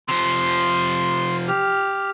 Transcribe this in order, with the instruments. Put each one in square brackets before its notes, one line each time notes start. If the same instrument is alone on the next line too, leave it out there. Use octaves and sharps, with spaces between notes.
[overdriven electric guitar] C3 F3 [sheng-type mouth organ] C6
[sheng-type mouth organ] G4 F6